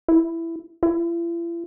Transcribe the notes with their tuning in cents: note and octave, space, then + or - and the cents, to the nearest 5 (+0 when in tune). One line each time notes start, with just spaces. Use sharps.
E4 +10
E4 +45